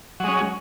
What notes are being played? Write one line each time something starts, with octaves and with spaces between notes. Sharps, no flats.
F#3 G#3 C#4